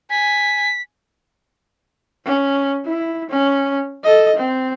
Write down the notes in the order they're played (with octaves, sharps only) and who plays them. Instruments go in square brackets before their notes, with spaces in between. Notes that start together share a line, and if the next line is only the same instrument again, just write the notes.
[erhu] G#5 [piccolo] B6
[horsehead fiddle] C#4
E4
C#4
A4 D#5
C4